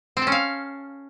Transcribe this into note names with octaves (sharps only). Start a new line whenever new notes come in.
C4
A4
C#4
F5